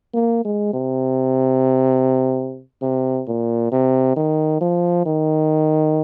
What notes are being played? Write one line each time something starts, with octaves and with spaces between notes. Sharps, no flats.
A#3
G#3
C3
C3
A#2
C3
D#3
F3
D#3